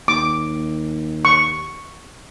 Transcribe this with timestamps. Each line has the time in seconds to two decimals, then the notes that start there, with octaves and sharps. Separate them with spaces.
0.08 D#2 D6
1.25 C#6